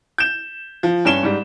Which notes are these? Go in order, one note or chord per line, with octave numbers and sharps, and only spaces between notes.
G6 E7
F3
G2 C#4 E7 G7
G#2 G3